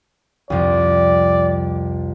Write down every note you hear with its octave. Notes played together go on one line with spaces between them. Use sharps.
C2 F2 D5